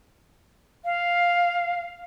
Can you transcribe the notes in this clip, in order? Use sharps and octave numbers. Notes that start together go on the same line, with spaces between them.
F5